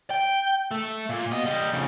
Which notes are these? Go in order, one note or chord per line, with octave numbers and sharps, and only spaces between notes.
G5
A3
A#2
B2 D#5
G3 D#5
F2 C#3